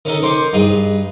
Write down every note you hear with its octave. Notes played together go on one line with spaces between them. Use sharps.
D#3 C#4 D#4 A4
D#3 C5 G5 C#6 D6
G2 D#4 G#4